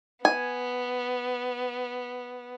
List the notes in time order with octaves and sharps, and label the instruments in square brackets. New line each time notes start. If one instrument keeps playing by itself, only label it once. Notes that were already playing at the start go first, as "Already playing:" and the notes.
[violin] B3 [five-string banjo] G#5